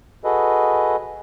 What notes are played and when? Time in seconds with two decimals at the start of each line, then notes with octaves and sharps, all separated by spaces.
0.24 F#4 G#4 A4 B4 D#5